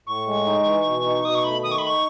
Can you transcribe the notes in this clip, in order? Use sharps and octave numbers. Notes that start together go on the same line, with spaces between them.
A2 C#6
G#3
D#4
E3
B2
D#4
B2 D#6
C#6
A3 B5
D#3 D#6
C#6
B5
D#4 C#6